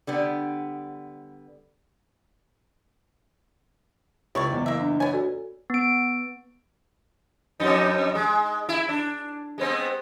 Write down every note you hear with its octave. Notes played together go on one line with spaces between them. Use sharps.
D3 G3 B3
C#2 E4 C#5 D5
F#1 E2
A#3 E5
D4
B3 C#5 G#5
F#4 A4 D5
B3 D7
F2 D#4
G#3
E4
D4
G#3 B3 C4